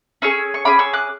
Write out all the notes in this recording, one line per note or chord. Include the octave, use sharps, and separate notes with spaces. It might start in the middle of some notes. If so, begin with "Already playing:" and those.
C#4 G#4 C#6 E6
C#6
C#4 G#4 B5 D6
C#6 E6
D6 F#6